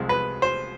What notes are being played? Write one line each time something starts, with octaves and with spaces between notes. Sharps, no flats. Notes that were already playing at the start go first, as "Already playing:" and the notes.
Already playing: C2 C3 F3 G#3
B4
C5